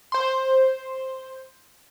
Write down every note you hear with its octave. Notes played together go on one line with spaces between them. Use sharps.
C5 C6